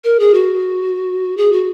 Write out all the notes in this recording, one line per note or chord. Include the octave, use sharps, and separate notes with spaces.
A#4
G#4
F#4
G#4
F#4